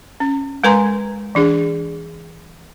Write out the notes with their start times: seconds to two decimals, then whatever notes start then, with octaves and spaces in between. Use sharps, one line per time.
0.20 C#4
0.64 G#3 A#4 B4 G#5 A#5 C6
1.35 E3 D4 G#4